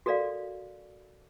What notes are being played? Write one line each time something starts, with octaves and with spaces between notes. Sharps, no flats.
F#4 A4 A#4 D5 F5